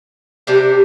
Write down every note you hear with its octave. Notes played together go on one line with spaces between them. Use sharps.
C3 G3 D4